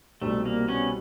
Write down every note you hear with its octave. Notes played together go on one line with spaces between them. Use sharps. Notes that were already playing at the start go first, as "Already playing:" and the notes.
C2 B2 G3 A3 C4 D#4
A#3
B3 C#4